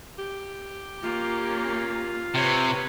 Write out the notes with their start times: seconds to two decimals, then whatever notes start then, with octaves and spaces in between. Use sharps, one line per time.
0.19 G4
1.02 A#3 C#4 F4
2.34 C3 B4 C#5